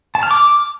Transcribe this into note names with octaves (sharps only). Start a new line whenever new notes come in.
A5
F6
D6